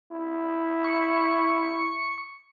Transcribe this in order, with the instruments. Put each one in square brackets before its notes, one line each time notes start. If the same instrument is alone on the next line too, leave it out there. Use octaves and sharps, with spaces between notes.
[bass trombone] E4
[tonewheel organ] C#6